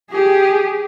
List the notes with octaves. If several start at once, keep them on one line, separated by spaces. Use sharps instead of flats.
G4 G#4